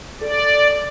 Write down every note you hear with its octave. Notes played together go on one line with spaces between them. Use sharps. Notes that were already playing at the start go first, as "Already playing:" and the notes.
A4 D5